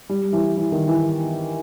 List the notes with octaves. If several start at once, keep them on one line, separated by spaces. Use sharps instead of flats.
G3
E3
E3
D#3
E3